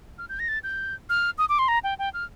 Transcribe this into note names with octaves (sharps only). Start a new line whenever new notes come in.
F6
G6
A#6
A6
G6
F6
D#6
D6
C6
A#5
G5
G5
F6